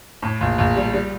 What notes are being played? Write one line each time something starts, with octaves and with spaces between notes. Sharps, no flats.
A2
A#1
A#1
G3
G3